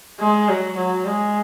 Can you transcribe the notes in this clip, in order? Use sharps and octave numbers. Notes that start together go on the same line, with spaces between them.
G#3
F#3
F#3
G#3